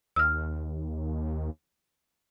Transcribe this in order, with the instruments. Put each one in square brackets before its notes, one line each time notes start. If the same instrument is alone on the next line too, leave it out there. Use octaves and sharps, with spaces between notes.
[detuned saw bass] D#2 [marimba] E6 F6